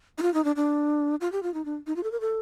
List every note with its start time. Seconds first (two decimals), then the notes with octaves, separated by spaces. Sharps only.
0.18 D#4
0.22 F4
0.34 D#4
0.45 D4
0.56 D4
1.21 F4
1.32 G4
1.43 F4
1.54 D#4
1.65 D4
1.87 D#4
1.96 F4
2.03 A4
2.12 A#4
2.21 A4